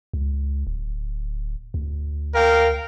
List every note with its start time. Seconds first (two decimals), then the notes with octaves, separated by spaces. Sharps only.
0.13 C#2
0.67 D1
1.74 D2
2.35 A#4 F5 G5